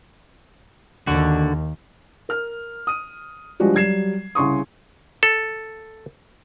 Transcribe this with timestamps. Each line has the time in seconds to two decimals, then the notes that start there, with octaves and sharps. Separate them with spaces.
1.07 D#2 D3 D#3 F#4
2.29 A#4 F6
2.87 D#6 D#7
3.60 F3 G3 G#3 D4 F#4 G4
3.74 F#3 G3 G#6 C7 E7
4.35 C2 C#3 C6 C#6 D#6
5.23 A4